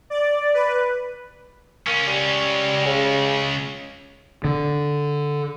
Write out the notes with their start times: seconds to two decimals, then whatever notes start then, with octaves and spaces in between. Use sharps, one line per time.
0.10 D5
0.54 B4
1.87 C#2 A#3 C#4
2.07 G3
2.86 C#3
4.44 D3